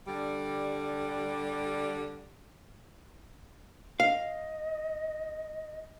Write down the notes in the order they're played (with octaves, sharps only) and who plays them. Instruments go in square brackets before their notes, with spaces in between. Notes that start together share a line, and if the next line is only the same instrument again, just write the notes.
[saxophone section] D3 G3
[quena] D#5 [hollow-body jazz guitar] F5